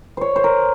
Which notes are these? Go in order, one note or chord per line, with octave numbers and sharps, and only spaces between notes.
C5 C#5
C5
A#4